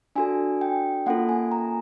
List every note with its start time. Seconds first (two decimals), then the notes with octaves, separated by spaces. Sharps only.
0.16 D4 F#4 A4 G#5
0.61 G5
1.06 A#3 C#4 F4 A4 F#5
1.29 G#5
1.52 A#5